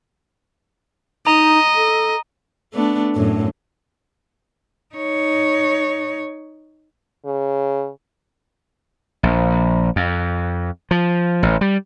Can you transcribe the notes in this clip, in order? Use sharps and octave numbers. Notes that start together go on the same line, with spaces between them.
D#4 D#5 A#5
A4
A3 B3 D4
F#2 A2
D#4 C#5
C#3
A#1
F2
F3
A1
G3